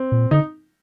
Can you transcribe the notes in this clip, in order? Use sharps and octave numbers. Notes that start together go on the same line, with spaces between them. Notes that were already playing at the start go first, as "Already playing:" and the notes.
Already playing: C4
A#2
D3 D#4